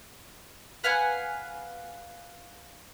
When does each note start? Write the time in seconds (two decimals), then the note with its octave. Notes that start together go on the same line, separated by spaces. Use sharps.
0.84 B4 F5 F#5 G#5